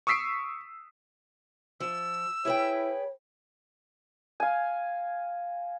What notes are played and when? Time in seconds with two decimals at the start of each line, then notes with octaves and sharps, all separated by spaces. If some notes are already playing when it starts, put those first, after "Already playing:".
0.07 C#6 D#6 E6 B6 C7 D7
1.80 F3 E6
2.45 E4 G#4 B4 C#5 G5
4.40 F5 G#5